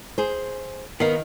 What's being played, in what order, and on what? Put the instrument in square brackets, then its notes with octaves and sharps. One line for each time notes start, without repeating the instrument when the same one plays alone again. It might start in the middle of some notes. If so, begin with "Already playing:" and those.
[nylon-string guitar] G#4 C5
[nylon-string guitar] D#3 [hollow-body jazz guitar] B3 A#4 F5